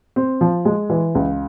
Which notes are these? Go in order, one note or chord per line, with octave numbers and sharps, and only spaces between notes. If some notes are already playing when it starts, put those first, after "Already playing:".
C4
F3
G#3
E3
C#2